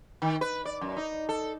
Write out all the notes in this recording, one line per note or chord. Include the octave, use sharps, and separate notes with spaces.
D#3
B4
D5
F#2
D#4
A4